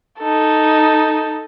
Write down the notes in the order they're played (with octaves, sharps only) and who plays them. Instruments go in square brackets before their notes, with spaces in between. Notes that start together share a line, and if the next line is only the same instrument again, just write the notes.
[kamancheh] D#4 A4